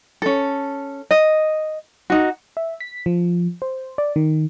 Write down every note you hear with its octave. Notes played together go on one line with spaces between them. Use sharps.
C#4 A4
D#5
D#4 F#4
E5
B6
F3
C5
D5
D#3